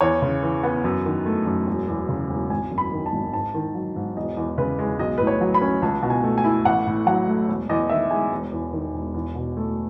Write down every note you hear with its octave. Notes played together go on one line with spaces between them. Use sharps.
E2 C#5
C#3
E3
B3
F#2
D#3
A3
F#2
E1
E2
C#3
E1
G#1 G#5
F#2
B5
D#3
A5
G#1
G#2 A5
D#3
F#3
G#2
E1 D#5
E2
C#3 B4
G#3
B1 D#5
A2 B4
C#5
F#3
B5
C#4
C#2 A5
B2
G#5
A3
G#5
E4
A1 F#5
A2
F#3 F#5
A3
E1
E2 D#5
D#3 E5
G#3 G#5
E1
E2
D#3
E1
E2
B2
A3